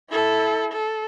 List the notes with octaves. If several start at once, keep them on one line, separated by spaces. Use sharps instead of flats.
E4 A4
A4